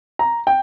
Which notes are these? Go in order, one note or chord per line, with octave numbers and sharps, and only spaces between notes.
A#5
G5